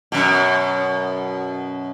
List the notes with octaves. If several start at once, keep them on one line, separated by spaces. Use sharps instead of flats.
F#2 B2